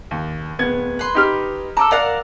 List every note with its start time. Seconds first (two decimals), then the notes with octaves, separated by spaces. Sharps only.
0.11 D#2
0.59 D1 B3 G#6
0.99 B4 C6
1.15 D#4 G4 F6
1.77 A4 A#5 D6 E6
1.92 A#4 D5 F5 F#5